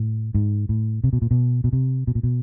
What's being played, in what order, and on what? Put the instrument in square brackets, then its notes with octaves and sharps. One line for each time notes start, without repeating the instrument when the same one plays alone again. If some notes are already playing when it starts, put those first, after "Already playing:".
Already playing: [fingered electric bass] A2
G#2
A2
C3
B2
A#2
B2
B2
C3
B2
A#2
B2